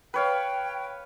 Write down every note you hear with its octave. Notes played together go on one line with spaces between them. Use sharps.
B4 C#5 F5 G5